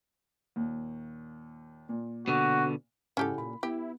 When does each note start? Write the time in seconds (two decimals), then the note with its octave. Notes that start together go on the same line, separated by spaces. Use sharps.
0.56 D#2 A#2
1.89 A#2
2.28 B2 D3 F#4
3.17 G#2 C#3 C#4 E4 G4 A4 F#5
3.38 A#2 B5
3.63 B3 E4 G4